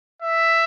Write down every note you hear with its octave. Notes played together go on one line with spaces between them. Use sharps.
E5